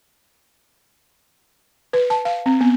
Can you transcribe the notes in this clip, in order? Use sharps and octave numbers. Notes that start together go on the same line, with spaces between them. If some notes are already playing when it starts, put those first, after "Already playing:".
B4
A5
F5
C4
B3